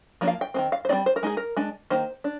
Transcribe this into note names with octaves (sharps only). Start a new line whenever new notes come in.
F3 A#3 D4
F5
G5
D#3 G#3 C4
F5
C5
G3 C4 D#4 D5
C5
A#4
G#3 D#4 G#4
A#4
G#3 D4
D#3 A#3 D#4 C5
D4